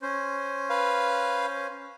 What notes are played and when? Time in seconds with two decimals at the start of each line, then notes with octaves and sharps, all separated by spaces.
0.02 C#4 C5
0.70 B4 F5